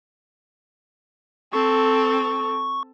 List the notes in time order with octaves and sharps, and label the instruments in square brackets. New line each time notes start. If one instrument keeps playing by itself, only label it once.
[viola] C4 [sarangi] A4 [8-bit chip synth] C#6